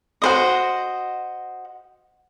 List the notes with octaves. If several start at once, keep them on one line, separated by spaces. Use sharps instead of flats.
F#4 C5 D#5